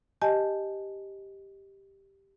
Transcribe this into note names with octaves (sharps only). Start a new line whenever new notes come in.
G4 D#5 G#5 A5